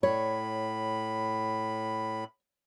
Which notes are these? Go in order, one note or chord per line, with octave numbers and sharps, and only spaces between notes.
A2 C#5 B5